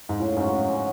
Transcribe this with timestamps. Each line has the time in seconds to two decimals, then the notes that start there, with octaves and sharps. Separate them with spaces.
0.09 G#2
0.20 A2 C#3
0.37 G#2 F#3 C#4
0.53 C#3
0.69 F#3 C#4